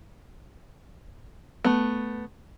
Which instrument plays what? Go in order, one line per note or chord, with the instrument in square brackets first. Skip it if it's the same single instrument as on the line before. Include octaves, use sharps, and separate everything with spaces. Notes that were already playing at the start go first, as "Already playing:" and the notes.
[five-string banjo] A3 B3